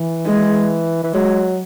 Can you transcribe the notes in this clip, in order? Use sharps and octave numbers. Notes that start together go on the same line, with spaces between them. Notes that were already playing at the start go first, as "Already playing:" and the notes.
Already playing: E3
G#3
E3
F#3 G#3